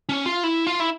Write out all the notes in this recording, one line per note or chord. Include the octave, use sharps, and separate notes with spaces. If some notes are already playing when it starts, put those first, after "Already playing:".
C#4
F4
E4
F4
E4